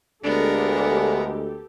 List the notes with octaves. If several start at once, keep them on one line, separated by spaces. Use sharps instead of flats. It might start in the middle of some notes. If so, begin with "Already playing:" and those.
D2 G#3 B3 D4 G4 A4 A#4